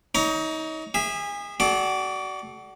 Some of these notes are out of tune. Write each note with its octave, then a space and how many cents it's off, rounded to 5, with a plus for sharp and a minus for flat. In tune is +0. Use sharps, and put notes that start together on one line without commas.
D#4 +30 C#5 +35 A#5 +5
G#4 -30 E5 -5
F#4 +30 A4 -45 D5 +0